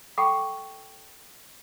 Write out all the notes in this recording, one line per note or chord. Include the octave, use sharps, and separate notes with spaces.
A4 F#5 G5 B5 C#6 D6